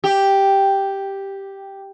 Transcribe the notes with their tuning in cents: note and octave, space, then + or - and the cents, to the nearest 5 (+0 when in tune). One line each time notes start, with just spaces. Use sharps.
G4 +0